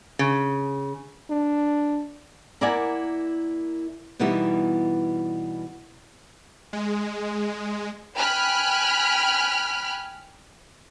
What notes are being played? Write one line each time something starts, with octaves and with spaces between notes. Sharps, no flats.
C#3
D4
A#3 E4 A#4 D5 F#5 G#5
B2 E3 G3 B3 D#4 E4
G#3
G5 G#5 B5 F6 F#6